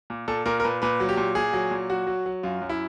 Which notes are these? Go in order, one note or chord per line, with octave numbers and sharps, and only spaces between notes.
A#2
A#2 A4
A#2 A#4
A#4
A#2 B4
A#2 B4
F#3
G4
A#2
A#2 G#4
F#3
A#2
F#3 F#4
F#3
F#3
F#2 F4
F#2
E4